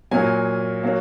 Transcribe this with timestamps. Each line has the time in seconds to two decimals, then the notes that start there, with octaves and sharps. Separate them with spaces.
0.11 A#2 F#3 A#3 G#5
0.83 F#3 A#3